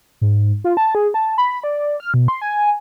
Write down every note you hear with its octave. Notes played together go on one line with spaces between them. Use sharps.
G#2
F4
A5
G#4
A5
B5
D5
F6
B2
C6
G#5